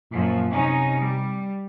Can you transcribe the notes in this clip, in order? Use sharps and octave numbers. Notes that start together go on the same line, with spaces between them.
F#2 A#2 F3
C3 C#4 D#4
G3